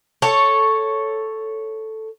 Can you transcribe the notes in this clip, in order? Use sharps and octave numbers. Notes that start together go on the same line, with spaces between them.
A4 C#5